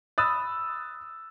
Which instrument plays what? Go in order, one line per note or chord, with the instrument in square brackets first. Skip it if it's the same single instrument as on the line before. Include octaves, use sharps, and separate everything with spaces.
[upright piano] B5 D#6 E6 F#6 A6